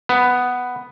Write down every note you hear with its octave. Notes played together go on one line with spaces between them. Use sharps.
B3